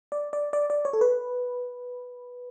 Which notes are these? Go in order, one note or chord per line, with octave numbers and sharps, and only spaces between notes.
D5
D5
D5
D5
C#5
A4
B4